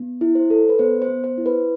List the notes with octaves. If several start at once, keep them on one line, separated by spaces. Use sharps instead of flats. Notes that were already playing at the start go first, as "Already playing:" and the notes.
Already playing: B3
E4
C5
A4
B4
B3 C5
C5
B3
C5
E4
B4